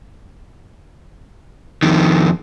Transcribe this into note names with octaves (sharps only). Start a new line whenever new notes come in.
F2 D#3